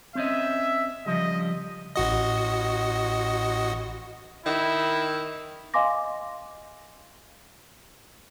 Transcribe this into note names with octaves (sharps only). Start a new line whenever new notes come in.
C4 C#4 D#5 E5
C#3 F3 G3 D#5
A1 F#4 D#5
D#3 E4
D#5 F5 G#5 C6 D6 A#6